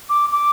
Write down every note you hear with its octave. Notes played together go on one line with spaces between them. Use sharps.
D6
D6